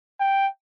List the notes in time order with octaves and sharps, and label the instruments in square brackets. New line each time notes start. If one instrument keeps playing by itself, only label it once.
[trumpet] G5